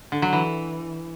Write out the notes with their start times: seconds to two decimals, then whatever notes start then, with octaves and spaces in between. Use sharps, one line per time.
0.12 D3
0.22 F#3
0.33 E3